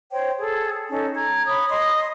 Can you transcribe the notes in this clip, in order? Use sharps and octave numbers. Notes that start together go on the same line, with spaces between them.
C5 C#5 G5
G#4 A4
C#4 D#4 A4
A#5 G#6
C#5 B5 D#6
D#5 C6 D#6